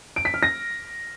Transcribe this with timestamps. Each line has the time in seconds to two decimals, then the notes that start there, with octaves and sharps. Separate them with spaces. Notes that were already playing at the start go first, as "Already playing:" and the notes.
0.16 D7
0.25 B6
0.34 F6
0.43 A#6